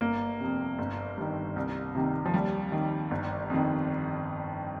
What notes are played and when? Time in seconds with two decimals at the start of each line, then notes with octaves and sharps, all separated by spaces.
0.01 G1 A#3
0.40 F2 C3
0.79 G1
1.18 G2 D#3
1.56 C2
1.95 C3 D#3
2.26 F3
2.33 D#2 G3
2.72 D#3
3.11 G1
3.50 F2 D#3